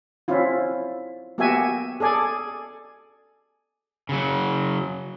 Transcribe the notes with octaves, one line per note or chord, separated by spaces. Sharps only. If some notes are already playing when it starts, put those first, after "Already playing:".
C4 C#4 E4 F4
A#3 B3 F#4 G4 E5 G#5
G#4 A4 D5 G#5
C#3 F#3